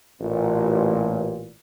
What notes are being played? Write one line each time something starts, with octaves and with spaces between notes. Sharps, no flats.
A1 A#2